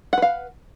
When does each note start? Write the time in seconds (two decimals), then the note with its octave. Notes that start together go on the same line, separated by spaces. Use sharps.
0.13 F#5
0.18 B4
0.22 F5